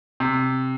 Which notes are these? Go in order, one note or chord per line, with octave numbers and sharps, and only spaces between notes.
C3